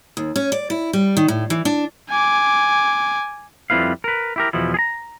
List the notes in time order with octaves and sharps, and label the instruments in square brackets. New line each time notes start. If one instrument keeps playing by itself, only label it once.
[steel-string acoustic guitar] D#2
C#4
D5
E4
G3
D#3
A2
E3
D4
[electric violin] G#5 D6
[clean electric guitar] F2 G3 C4 E4 B4 F5
A#4 B4
E4 G4 A#4
E2 B2 F3 E4
G#4 A#5